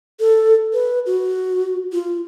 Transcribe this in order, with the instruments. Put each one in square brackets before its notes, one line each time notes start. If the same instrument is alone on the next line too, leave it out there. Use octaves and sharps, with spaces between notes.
[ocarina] A4
B4
F#4
F4